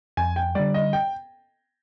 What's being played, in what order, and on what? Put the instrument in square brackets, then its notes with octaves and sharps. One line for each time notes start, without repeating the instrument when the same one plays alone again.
[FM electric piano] F2 [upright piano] G#5
[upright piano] G5
[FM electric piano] D3 G3 [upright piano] D5
[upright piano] D#5
G5